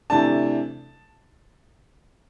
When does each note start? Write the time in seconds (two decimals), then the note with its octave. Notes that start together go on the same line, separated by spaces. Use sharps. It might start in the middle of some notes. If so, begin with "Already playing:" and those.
0.10 C3 E3 A3 D4 A5